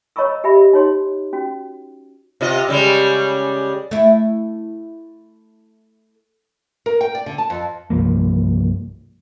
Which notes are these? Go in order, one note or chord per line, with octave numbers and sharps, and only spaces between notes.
C#5 D#5 A#5 B5 C#6 E6
G4 D#5 E5 B5
D#4 C#5 C6
C#4 F#4
C3 F4 D#5
C#3 G3 G#3
A3 E4
A#4
G5
D5
D3
A5
F2
C2 G2 F3 A#3